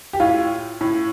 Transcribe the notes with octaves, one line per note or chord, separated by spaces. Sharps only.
G4
A2 F4
A2